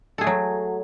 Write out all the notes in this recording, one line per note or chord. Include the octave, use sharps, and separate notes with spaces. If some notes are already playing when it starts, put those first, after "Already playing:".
F#3 A3 G#4 A4